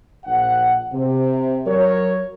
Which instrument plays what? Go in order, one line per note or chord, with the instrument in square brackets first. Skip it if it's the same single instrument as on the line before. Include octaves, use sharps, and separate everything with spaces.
[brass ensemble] A#1 F#5
C3
F#3 A#4 C#5